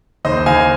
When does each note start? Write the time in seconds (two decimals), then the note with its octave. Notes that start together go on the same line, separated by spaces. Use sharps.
0.25 D#2 C5 D#5
0.46 D#2 F5 G#5